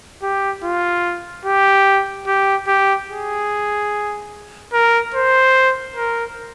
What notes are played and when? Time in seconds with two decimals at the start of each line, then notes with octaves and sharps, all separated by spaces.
0.23 G4
0.63 F4
1.45 G4
2.27 G4
2.68 G4
3.10 G#4
4.73 A#4
5.14 C5
5.96 A#4